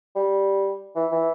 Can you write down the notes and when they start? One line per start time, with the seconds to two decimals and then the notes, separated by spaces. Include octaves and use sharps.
0.15 G3
0.95 E3
1.12 E3